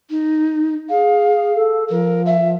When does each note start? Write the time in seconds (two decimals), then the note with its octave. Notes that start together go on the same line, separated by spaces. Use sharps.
0.10 D#4
0.89 G#4 F5
1.55 A4
1.90 F3 A#4
2.26 E5